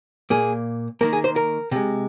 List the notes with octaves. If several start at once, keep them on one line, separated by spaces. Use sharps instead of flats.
A#2 A#3 G#4
D#3 A#3 A#4
G#4
C5
A#4
C3 G#3